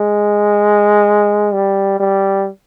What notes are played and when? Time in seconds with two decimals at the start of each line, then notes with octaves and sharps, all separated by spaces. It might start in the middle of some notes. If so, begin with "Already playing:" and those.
Already playing: G#3
1.53 G3
2.00 G3